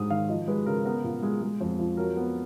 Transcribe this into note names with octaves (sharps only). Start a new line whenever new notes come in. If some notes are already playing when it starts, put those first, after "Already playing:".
Already playing: G#2 G#3 D#6
D#3 F5
F3 D#5
G#3 B4
C#3 A#4
B3 A#4
A#2
G#3
G#3
F2
F3
F#3 A#4
B3